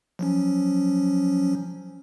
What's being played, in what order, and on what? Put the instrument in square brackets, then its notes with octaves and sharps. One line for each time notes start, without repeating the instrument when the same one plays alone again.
[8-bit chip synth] F3 F#3 C#4